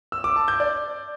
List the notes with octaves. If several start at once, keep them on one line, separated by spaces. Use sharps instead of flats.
E6
D6
A5
G6
D5